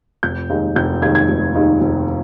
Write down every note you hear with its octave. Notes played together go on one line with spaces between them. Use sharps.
F1 G6
D#2 D#3 G#3 D#4
F1 G6
D#2 D#3 G#3 D#4 G#6
G#6
F1
D#2 D#3 G#3 D#4
F1